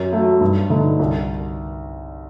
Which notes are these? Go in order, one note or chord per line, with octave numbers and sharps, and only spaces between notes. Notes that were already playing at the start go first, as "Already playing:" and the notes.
Already playing: F#2
F#3 A3
G2
D3 A3 D#4
C2